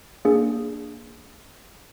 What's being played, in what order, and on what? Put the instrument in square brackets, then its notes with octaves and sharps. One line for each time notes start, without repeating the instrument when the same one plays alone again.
[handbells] A#3 D4 G#4